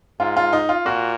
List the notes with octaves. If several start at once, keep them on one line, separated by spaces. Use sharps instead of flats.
G#2 F4
F4
D#4
F4
A#2 F#4